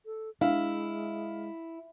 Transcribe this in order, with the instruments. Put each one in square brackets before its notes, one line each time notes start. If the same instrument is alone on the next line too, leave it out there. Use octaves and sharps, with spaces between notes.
[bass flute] A4
[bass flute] G#3 [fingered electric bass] D4 [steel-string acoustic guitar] E4 [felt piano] F5